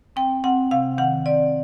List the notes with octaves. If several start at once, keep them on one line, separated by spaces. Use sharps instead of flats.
C4 G5
C4 F#5
C3 F5
D#3 F#5
C4 D5